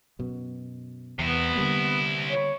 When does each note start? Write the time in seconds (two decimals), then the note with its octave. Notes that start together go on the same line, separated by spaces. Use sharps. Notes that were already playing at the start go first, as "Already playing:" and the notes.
0.19 F#2 B2
1.19 E2 C3 B3 E4
1.55 D3 G3 A#3
2.30 C#5